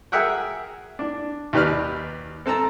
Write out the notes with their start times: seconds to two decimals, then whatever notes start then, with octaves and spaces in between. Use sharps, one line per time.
0.12 G#4 A#4 E5 F#5 G5
0.99 D4
1.53 D#2 G4 B4 D5 F6
2.46 C4 A4 A5 A#5